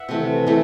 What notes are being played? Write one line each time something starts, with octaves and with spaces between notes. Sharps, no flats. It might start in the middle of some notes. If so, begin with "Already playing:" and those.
Already playing: E5 F#5
C3 E3 A3
C3 E3 A3